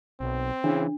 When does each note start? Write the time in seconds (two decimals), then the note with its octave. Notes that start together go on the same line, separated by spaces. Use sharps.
0.20 B1 C4
0.64 C#3 E3 D4